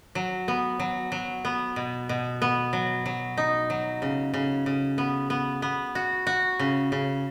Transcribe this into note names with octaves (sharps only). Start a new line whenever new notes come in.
F#3
B3
F#3
F#3
B3
B2
B2
B3
F#3
F#3
D#4
F#3
C#3
C#3
C#3
B3
B3
B3
F#4
F#4
C#3
C#3